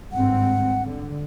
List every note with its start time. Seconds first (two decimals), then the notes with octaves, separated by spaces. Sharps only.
0.12 G#1 G2 C4 F#5
0.85 D3